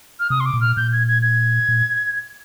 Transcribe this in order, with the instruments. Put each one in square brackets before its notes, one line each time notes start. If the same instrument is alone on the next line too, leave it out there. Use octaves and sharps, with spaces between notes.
[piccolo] F6
[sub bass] C3 [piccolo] D#6
[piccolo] C6
D6
[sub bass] A#2
[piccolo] F6
[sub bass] A#2 [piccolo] G6
[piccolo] G#6
G#6
G#6
[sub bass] A#2